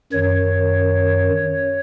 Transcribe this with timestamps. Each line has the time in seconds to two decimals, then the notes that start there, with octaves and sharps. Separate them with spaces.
0.13 F#2 D#3 C#5